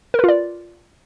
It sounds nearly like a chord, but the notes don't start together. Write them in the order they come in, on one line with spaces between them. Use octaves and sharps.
A#4 B4 F4 D5